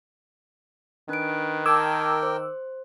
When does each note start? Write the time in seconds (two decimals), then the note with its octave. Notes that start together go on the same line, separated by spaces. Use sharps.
1.09 D#3 D4 B4 D7
1.66 A#4 G5 A5 D6 E6 G#6
2.23 C5